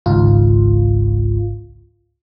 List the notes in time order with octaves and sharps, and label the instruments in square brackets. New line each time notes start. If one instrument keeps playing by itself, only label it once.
[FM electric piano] G#1 C#2 G#2 F4